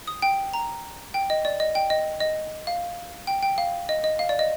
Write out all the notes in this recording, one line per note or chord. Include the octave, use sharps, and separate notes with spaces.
D#6
G5
A#5
G5
D#5
D5
D#5
G5
D#5
D#5
F5
G5
G5
F5
D#5
D#5
F5
D5
D#5